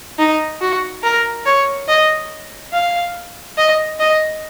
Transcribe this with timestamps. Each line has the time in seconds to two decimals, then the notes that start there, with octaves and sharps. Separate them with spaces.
0.19 D#4
0.61 F#4
1.03 A#4
1.46 C#5
1.88 D#5
2.73 F5
3.58 D#5
4.00 D#5